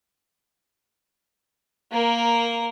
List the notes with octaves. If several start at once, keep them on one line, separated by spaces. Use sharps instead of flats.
A#3 A#4